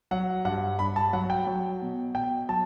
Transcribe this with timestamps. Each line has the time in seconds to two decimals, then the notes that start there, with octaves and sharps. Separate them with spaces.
0.11 F#3 F#5
0.45 G2 F#5
0.79 G2 B5
0.96 A5
1.13 F#3 F#5
1.30 G5
1.47 F#3
1.82 B2
2.15 B2 G5
2.49 F#3 A5